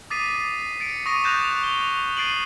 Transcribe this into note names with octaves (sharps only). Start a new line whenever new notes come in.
D6 D#6 A6 B6 C7 D#7
A6 C#7 D7
C#6 D#6 A#6 D#7
F#6 G6 A6 A#6 E7 F7
G7
A6 C7 D7 D#7 F#7